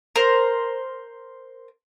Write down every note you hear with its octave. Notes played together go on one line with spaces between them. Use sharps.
A#4 C5